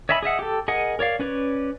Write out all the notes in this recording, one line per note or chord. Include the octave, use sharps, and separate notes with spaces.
C#5 D#5 E5 G#5 B5
G#4 D#5 E5 F#5
G4 A4
G#4 A#4 D#5 F#5 G#5
A#4 C#5 D5 F5
C#4 B4 C#5 D5